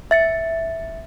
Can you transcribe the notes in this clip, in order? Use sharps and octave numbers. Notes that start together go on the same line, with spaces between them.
E5 A6 C#7